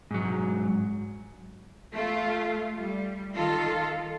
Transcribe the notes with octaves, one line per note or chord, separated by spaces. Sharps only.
G#2 F#3
A3 F4
G3
D#3 F4 A4